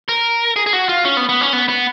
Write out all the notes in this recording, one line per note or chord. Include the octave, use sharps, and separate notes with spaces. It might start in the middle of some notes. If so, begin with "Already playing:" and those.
A#4
G#4
G#4
F#4
F4
C#4
B3
B3
C#4
B3
B3